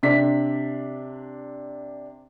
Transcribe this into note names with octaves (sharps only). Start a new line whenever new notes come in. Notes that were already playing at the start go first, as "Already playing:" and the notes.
C3 D4 B6